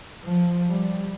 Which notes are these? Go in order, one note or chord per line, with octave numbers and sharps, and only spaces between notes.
F3
G3